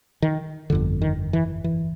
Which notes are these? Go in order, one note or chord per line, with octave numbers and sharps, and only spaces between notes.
D#3
G1 F2 D3
D#3
E3
E3